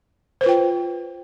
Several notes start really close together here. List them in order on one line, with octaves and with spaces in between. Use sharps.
C5 B4 F4 G5